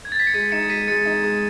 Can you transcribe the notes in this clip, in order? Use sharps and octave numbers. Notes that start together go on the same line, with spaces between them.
G#6
A6
B6
C#7
G#3 B6 D#7
D#4 C#7 E7
G#3 B6 D#7
G#3 A6 C#7
D#4
G#3